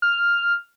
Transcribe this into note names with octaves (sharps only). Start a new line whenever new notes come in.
F6